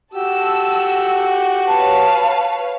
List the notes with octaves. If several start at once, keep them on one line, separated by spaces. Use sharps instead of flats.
F#4 G4 A5 E6
B4 C#5 F5 A5